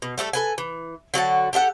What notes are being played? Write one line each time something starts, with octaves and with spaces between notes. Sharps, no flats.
B2
G3 A3 D#4 A4
A4 B4 G#5
E3
D3 F#3 F#4 A5
G4 A4 E5 F#5